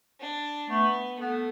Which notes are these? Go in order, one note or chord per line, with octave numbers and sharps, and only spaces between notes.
D4
A3 B3
A3 B3